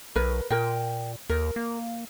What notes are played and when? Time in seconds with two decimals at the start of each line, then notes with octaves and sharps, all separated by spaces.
0.16 B1 A#4 B4
0.50 A#2 A#4 G5
1.29 D#2 A#4
1.56 A#3